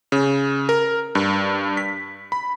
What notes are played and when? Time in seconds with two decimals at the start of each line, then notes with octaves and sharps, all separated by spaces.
0.12 C#3
0.69 A#4
1.15 G2
1.77 B6
2.32 B5